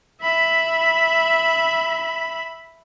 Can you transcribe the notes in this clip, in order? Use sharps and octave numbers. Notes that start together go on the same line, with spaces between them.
E5 B5